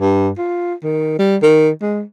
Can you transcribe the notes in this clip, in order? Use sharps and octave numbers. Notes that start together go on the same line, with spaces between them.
G2
F4
D#3
G3
D#3
G#3